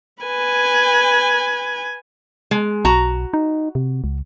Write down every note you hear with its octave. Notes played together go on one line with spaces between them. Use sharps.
B4 G#5
G#3
B1 F#4 A#5
D#4
C3
C#2